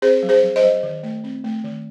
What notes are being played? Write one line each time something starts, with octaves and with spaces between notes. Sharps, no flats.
C4 G#4 C5
F#3
G#4 C5
F#3
C5 D#5
F#3
D#3
A3
C4
A3
D#3